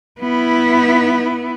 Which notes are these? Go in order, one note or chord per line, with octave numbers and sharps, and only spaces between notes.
B3 E4